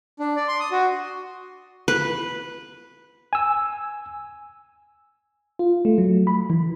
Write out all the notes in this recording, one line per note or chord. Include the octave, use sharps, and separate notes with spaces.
D4
D5
C6
D#6
F#4
B4
G#5 E6
F4
A3
F#3
B5
E3